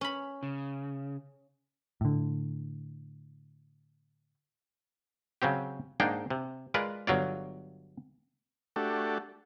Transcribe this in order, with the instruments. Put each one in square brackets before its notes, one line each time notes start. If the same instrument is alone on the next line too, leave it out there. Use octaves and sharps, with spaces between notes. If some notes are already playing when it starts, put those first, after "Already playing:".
[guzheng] C#4 B5
[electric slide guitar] C#3
[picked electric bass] A2 D3
[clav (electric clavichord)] C#3 F#3 C4 G4
G#2 A#3 D4 D#4 G#4 G5
C3
G#3 F4 A#4 B4 D5
G1 F#3 F4 D5
[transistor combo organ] A3 D4 F#4 G4 A4